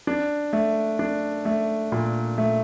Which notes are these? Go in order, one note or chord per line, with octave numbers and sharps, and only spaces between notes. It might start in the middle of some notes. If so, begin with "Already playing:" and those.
D4
A3
D4
A3
A#2
A3